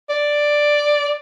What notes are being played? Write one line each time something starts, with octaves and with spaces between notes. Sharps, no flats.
D5